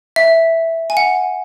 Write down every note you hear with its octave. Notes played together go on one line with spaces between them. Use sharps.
E5
G#5
F#5